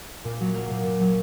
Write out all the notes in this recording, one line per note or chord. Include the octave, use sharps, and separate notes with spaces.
A#2
F#3
A#3
A#2
A#2
F#3